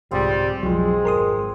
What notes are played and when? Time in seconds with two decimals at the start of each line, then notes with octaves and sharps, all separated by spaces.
0.11 C2 G#2 D3 G3 C4 F4 G#4
0.63 B1 F2 F3 F#3 G#3
1.05 G#1 A#4 C6 D#6